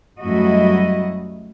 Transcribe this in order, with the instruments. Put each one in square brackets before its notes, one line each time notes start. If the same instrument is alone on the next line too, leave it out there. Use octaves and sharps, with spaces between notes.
[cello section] F#2 G3 A3 E4 F#4 D#5